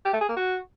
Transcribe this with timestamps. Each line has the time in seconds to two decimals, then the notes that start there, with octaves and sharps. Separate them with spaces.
0.05 G4
0.13 A3
0.21 G#4
0.29 A#3
0.37 F#4